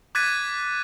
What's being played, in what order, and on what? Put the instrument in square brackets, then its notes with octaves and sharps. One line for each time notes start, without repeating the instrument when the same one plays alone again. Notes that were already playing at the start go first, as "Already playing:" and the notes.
[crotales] D6 F#6 G#6 A6 B6 D#7